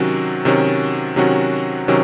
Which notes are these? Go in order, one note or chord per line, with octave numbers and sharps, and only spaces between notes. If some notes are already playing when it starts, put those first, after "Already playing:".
Already playing: C3 D#3 F#3 C#4 F#4
C3 D#3 F#3 C#4 F#4
C3 D#3 F#3 C#4 F#4
C3 D#3 F#3 C#4